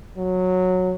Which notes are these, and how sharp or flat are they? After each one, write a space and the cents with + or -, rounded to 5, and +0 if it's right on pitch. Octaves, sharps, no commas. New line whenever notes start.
F#3 -10